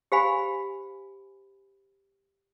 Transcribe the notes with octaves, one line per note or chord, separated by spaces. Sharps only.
G4 C5 F5 G#5 B5